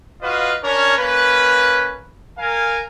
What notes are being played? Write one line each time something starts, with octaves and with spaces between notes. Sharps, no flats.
F4 F#4 B4 D#5 F5
C#4 D4 A#4 C#5
A#3 C#4 B4
A#4 F5 G#5